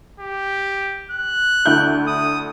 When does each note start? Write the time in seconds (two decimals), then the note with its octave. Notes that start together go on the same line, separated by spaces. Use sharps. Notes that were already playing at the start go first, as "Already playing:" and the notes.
0.20 G4
1.11 F#6
1.66 D2 E4 G6
2.07 D#6